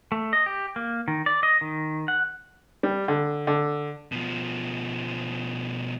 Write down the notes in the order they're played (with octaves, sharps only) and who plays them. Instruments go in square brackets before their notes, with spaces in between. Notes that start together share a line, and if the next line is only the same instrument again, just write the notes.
[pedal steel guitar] A3
D#5
G4
A#3
D#3
D5
D#5
D#3
F#5
[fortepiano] G3
D3
D3
[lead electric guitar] B2 F3